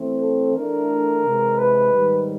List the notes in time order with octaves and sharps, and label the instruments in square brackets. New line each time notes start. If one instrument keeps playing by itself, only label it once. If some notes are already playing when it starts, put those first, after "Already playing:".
Already playing: [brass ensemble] E3 A3 C4
[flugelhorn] A4
[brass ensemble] E3 A3 D4 [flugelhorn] A#4
[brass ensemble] C3 E3 G#3
[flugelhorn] B4
[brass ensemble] G#2 D#3 G3